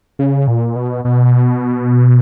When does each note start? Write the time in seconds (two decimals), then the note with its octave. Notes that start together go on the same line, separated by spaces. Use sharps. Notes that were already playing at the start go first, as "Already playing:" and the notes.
0.19 C#3
0.48 A#2
0.76 B2
1.05 B2